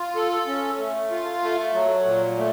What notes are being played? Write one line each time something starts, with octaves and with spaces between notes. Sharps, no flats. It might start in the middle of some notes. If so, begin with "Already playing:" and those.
Already playing: F4
A4
C#4
A3
F4
A3
F#3
A#2
A3